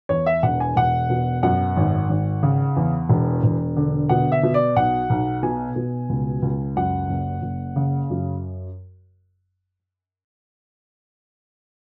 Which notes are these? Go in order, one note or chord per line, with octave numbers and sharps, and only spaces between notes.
E2 C#5
E5
E1 F#5
G#5
E1 F#5
B2
F#2 F#5
G#1
G#1
C#3
E2
E1
E1
D3
B2 F#5
E5
B2
D5
B1 F#5
B1
B2 G#5
B2
C#2
C#2
F#2 F#5
F#1
F#1
C#3
F#2